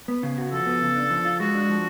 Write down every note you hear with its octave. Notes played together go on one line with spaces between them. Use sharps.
B3
C#3
F#4
F3 A4
B3
C#3
D4
F3
F4
G#3 F#4
D4
F3